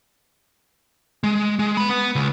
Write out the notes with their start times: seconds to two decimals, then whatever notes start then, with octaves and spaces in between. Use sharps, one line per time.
1.24 G#3
1.59 G#3
1.77 B3 B5
1.89 B3
2.15 C#2